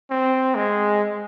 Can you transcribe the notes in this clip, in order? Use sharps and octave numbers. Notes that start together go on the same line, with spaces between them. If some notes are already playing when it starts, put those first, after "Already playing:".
C4
G#3